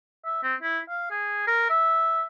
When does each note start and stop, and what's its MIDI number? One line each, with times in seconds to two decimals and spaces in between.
0.25 0.40 76
0.43 0.55 60
0.62 0.79 64
0.89 1.09 77
1.11 1.47 68
1.48 1.69 70
1.70 2.25 76